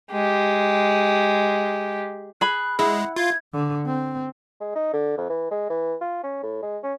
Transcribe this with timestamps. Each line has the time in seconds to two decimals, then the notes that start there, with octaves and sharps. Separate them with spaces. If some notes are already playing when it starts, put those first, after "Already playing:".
0.11 G#3 G4
2.41 G#4 B5 F#6
2.79 G#3 E4 F#5
3.16 F4 G#6
3.53 D3
3.86 C4
4.60 G#3
4.75 D#4
4.93 D3
5.18 F2
5.30 E3
5.51 G#3
5.70 E3
6.01 F4
6.23 C#4
6.43 A2
6.62 G#3
6.83 C#4